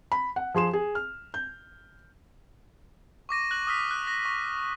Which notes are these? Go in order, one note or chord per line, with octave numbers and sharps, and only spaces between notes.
B5
F#5
F3 G#4 C6 E7
G#4
F6
G6
C#6 D6 A#6 D#7
F#6 F#7
D#6 F6 B6
F#6
A#6
C#6